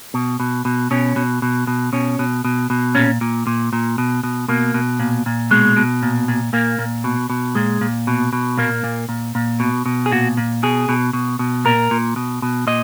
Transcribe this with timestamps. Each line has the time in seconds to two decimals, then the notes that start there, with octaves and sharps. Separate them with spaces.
0.14 B2
0.40 B2
0.65 B2
0.91 B2 C#4
1.16 B2
1.42 B2
1.67 B2
1.93 B2 C#4
2.19 B2
2.44 B2
2.70 B2
2.95 A#2 C#4
3.21 A#2
3.47 A#2
3.73 A#2
3.98 B2
4.23 B2
4.48 B2 A#3
4.74 B2
5.00 A#2
5.26 A#2
5.51 B2 G#3
5.77 B2
6.03 A#2
6.28 A#2
6.53 A#2 A#3
6.79 A#2
7.04 B2
7.30 B2
7.55 A#2 G#3
7.81 A#2
8.07 B2
8.33 B2
8.58 A#2 A#3
8.84 A#2
9.09 A#2
9.35 A#2
9.60 B2
9.86 B2
10.06 G#4
10.12 A#2 F#4
10.37 A#2
10.63 B2 G#4
10.89 B2
11.13 B2
11.39 B2
11.65 A#2 A#4
11.91 A#2
12.16 B2
12.42 B2
12.67 A#2 D#5